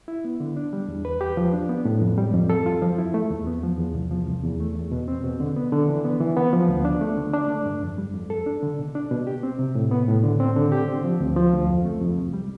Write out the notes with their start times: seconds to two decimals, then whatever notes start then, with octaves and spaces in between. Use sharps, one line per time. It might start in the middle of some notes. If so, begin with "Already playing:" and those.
0.08 E4
0.25 B3
0.40 D3
0.57 D4
0.73 G3
0.88 E2
1.05 B4
1.21 G4
1.37 F3
1.53 D4
1.69 B3
1.85 A2
2.02 F2
2.18 G3
2.34 F2
2.50 A4
2.66 F4
2.82 F3
2.98 E4
3.14 A3
3.30 E2
3.47 B3
3.63 F3
3.78 E2
3.95 C2
4.11 F3
4.27 C2
4.43 E2
4.60 A3
4.76 E2
4.92 B2
5.08 C4
5.24 B2
5.40 D3
5.56 B3
5.72 D3
5.88 E3
6.05 B3
6.21 E3
6.37 B3
6.53 F3
6.69 D2
6.85 D4
7.01 A3
7.17 D3
7.33 D4
7.50 A3
7.66 G2
7.82 F2
7.98 G3
8.14 F2
8.30 A4
8.46 D4
8.62 D3
8.79 B2
8.95 D4
9.11 B2
9.27 G4
9.43 C4
9.59 C3
9.75 A2
9.91 B3
10.08 A2
10.24 D3
10.40 C4
10.56 D3
10.72 G4
10.88 C4
11.04 F3
11.20 D2
11.37 F3
11.53 D2
11.69 F2
11.85 A3
12.01 F2
12.17 C2
12.33 G3